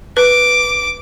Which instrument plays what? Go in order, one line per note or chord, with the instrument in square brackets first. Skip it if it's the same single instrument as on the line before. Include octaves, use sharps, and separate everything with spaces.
[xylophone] B4 [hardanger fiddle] D6